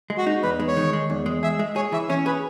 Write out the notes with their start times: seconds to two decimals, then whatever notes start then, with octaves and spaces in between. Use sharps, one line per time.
0.10 G#3
0.18 F#4
0.27 D#4
0.43 E2 B4
0.60 G#3
0.68 C#5
0.77 D#3
0.93 G#3
1.10 E2
1.26 G#3
1.43 G#4 E5
1.59 G#3
1.76 G#4 C#5
1.92 E3 E5
2.09 C#4 C#5
2.26 G#4 B4